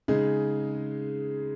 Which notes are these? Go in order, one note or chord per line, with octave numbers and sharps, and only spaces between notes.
C#3 G#3 D#4 G#4